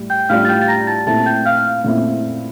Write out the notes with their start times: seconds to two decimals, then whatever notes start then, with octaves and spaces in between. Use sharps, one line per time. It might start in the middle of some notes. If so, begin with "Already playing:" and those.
Already playing: A2 G3
0.10 G5 G6
0.29 A2 G3 D4 F4 F5 F6
0.45 A6
0.49 G5 G6
0.61 A6
0.68 A#5 A#6
0.87 A5 A6
1.06 A#2 A3 C4 E4 A5 A6
1.26 G5 G6
1.46 F5 F6
1.84 A#2 A3 C4 E4